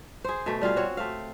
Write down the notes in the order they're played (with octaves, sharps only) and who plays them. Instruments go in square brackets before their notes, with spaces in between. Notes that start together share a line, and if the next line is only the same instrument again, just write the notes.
[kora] G#4 C5
B2 A3
G3 F4 G#4 F5
C4 F#4 C#5
A3 C4 F5